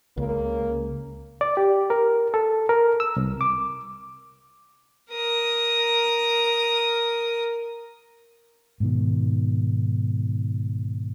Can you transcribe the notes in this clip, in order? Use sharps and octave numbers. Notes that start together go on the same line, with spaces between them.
C#2 C#3 A#3
D5
G4
A#4
A4
A#4
E6
C2
D6
A#4 D#6
G#2 B2 D#3